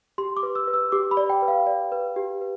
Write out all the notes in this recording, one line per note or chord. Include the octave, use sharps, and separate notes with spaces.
G4 C6
D6
B4
E6
B4
E6
G4 D6
B5
D5
G5
B4
F5
D5
B4
G4
B4